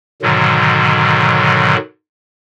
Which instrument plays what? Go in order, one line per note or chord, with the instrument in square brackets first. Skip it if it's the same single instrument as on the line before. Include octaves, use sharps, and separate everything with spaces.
[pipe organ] G#2 B2 D3 D#3 F#3